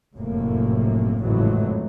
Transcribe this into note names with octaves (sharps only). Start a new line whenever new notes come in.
F1 F#2 A2 C3 A#3
G#1 F2 A2 C#3 E3 F#3